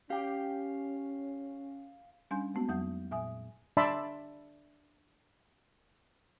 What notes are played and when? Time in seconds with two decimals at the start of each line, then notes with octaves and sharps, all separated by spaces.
0.10 C#4 G4 F5 G5
2.31 G3 C#4 D4 G#5 C6 G6
2.54 G#3 A#3 B3 F#4
2.69 F2 F#3 F#5 D#6 G6
3.11 A#2 E5 G#5 D#6
3.77 D4 D5 E5 A5 B5 C6